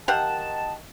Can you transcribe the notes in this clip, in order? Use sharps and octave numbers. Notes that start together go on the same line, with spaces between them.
D#3 G4 F5 F#5 A5